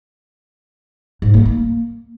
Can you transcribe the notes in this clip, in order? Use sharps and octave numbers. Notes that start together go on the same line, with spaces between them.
G#2
A#3
A#3